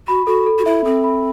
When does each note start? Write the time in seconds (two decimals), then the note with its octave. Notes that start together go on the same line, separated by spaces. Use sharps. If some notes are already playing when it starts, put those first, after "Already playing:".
0.08 F#4 B5
0.26 F#4 A4
0.46 A4
0.58 F#4
0.65 E4 E5
0.85 C4 A4
1.04 B5